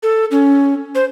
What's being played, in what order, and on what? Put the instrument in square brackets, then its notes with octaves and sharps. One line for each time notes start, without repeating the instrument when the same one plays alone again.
[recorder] A4
C#4
C5